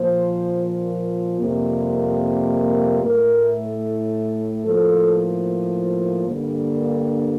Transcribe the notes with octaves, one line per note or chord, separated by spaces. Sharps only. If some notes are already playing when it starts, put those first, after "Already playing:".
Already playing: A#2 F3 A#3 C5
F2 C3 G3 A#3
A2 A3 A#4
A2 F3 A#3 A4
G2 D3 G3 A#3